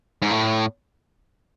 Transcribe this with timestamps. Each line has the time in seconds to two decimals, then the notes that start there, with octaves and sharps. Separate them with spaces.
0.22 G#2
0.31 A2